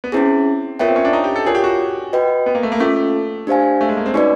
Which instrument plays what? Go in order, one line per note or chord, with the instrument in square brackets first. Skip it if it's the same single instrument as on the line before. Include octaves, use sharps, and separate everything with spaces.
[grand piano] B3
[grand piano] C4 [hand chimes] C#4 E4 G#4
[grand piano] B3 [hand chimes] F4 A#4 C#5 E5 G5
[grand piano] C4
C#4
D4
D#4
G4
A4
[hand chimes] F4 A#4 C#5 [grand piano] G#4
[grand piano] G4
F#4
[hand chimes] F#4 B4 D#5 G5
[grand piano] B3
A#3
A3
A#3
[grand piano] A3 [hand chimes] C#4 F4 A4
[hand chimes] D4 G4 C5 F5 G#5
[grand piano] A3
G#3
A#3
C4
[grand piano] C#4 [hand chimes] D#4 F#4 B4 D5